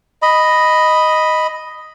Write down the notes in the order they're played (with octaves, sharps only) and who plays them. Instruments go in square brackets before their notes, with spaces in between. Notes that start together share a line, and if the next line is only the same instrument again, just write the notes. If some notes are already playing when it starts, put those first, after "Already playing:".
[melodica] D#5 B5